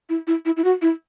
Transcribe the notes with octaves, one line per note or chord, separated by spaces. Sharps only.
E4
E4
E4
E4
F#4
E4